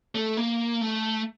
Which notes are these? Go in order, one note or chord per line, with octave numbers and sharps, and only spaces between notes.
A3
A#3
A3